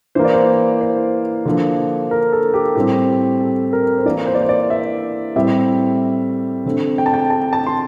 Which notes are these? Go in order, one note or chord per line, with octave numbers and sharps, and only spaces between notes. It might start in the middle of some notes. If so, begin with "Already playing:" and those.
E3 A#3 C5
D5
C5
C5
D3 F3 A#3
A#4
A4
G4
A2 G3 C4 G4
A4
A#4
C5
E3 A#3 D5
C5
D5
C5
D5
E5
A2 G3 C4 E5
D3 A3 C4
G5
A5
G5
A5
A5
C6